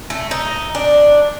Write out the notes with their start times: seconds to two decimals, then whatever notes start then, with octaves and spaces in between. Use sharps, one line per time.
0.10 A3
0.31 D#4
0.75 D4